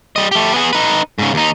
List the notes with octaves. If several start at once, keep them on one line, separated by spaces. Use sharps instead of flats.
G3 D#5
A3 G4
B3 G#4
D#4 B4
G#2 C#3
D#2 D#4